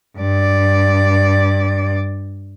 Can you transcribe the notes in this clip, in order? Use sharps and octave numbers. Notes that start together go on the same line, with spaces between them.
G2 D5